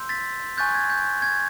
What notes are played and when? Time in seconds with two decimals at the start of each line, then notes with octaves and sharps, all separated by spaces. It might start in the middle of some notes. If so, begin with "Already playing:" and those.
Already playing: C6 E6 G6
0.09 A6 B6
0.57 G#5 C#6 F#6 G6 A6
0.75 G#6
0.90 G6
1.22 G#6